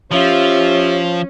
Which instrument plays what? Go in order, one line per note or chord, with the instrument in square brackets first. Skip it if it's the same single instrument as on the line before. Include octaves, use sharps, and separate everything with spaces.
[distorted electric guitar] F3 [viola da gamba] C#4 [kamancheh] F4 E5 [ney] G4